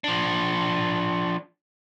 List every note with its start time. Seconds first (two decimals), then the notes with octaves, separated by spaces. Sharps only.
0.04 F3 D4